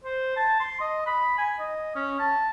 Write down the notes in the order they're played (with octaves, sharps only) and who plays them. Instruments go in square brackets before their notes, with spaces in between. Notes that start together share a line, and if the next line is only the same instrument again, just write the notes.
[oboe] C5
A5
C6
D#5
B5
G#5
D#5
C#4
A5